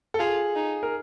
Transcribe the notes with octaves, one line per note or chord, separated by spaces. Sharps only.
A4
F4 G#4
D#4
A#4